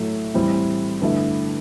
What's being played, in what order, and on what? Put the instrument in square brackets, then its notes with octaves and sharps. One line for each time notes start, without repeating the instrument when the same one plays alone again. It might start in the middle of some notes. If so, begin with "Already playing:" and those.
Already playing: [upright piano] A2 F#3 A3
A2 E3 G3 C4 E4
G2 D3 A3 E4